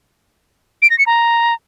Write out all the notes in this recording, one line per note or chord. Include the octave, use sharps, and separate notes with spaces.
D7
A#6
C#7
A#5